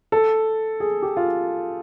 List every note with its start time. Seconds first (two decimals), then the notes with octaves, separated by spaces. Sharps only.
0.12 A4
0.80 G#4
1.02 G4
1.17 F4